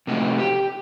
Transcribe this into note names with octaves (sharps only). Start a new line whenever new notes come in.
C3 A3 D#4 F#4
G4